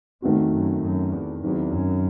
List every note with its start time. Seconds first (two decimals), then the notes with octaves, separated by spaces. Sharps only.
0.22 E2 D#3 A3 C4 F#4
0.52 F#2
0.82 F#2
1.13 E2
1.42 E2 D#3 F#3 C4
1.72 F#2